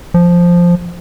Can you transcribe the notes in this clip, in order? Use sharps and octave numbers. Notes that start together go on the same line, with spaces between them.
F3